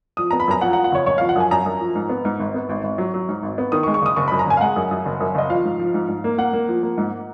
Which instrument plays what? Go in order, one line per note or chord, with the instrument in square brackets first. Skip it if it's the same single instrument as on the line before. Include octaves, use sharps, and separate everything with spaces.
[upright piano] F3 D#6
B3 A#5
B5
F#2 A#5
F3 F#5
F#5
F3
F#5
F#1 C#5
F#1 C#5
F3 F5
F#5
F#2 G#5
F#2 A#5
F#2
F3
G#2
B3
G#2
G#1
B3
G#1
G#1
F#3
F#3
G#2
G#1
B3
D#3 D#6
C#6
G#3
C#6
F#1 D#6
F#1 C#6
F#2 B5
A#5
F#1 G#5
F5
G#3 F#5
F#2
F#2
F#1
F#2
F#1 D#5
F3 F5
G#2
F3
G#2
G#2
A#3
A#3 F#5
A#3
F3
A#3
G#2